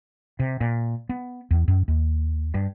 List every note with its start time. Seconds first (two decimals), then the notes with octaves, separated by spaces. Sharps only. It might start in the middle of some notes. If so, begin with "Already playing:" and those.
0.39 C3
0.61 A#2
1.09 B3
1.50 E2
1.68 F#2
1.88 D#2
2.54 G2